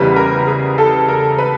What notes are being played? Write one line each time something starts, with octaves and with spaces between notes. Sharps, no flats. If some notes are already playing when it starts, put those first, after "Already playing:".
Already playing: F#1 E2 C#3 E3 G3 B4
A#4
G#4
A4
A#4
B4